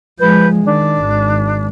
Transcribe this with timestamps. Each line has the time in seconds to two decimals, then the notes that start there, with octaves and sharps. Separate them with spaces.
0.20 F3 G#3 B4 G6
0.65 D#3 D4
0.98 G#1